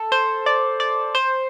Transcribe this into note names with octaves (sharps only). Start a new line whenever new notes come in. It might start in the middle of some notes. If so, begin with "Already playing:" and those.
Already playing: A4
C5
D5
D5
C5